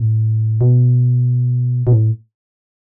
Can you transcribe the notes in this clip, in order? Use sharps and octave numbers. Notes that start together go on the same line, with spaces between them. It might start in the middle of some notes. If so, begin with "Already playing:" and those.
Already playing: A2
B2
B2
A2